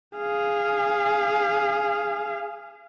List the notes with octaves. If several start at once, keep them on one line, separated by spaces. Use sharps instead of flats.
G#4 F5